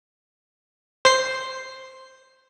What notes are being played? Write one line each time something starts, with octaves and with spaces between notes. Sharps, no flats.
C5 C7